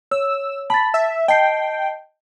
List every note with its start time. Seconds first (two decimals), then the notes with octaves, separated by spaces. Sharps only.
0.11 C#5 E6
0.70 A5 B5 A6
0.94 E5
1.28 D#5 G5 A5 C7